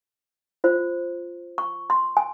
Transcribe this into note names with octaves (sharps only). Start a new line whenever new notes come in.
F4 C5
C#6
C6
G#5